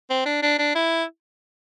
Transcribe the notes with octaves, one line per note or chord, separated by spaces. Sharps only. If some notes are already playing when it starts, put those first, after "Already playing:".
C4
D4
D4
D4
E4